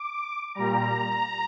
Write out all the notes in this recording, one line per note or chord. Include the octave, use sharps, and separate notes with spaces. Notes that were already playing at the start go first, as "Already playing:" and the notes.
Already playing: D6
A#2 G3 A#5